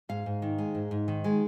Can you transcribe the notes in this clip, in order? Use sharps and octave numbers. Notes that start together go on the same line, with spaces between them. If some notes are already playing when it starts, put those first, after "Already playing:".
G#2 F5
G#2
D#3
G#3
G#2
G#2
D#3
G#3